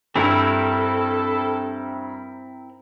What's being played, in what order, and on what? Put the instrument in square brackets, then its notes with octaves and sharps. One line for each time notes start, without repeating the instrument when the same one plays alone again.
[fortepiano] G2 [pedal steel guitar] C4 E4 A#4 [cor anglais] A4